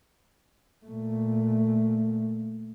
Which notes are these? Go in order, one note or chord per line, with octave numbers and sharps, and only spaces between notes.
A#2 A3